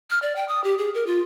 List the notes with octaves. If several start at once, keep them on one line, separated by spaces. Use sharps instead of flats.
F6
D5
G5
D#6
G4
G#4
A#4
F4